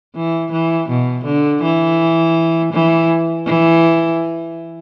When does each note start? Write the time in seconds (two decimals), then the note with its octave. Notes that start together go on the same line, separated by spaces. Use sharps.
0.16 E3
0.52 E3
0.89 B2
1.25 D3
1.63 E3
2.73 E3
3.46 E3